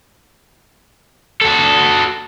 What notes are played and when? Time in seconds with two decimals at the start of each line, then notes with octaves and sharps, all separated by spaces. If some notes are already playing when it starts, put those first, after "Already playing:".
1.42 F#4 A4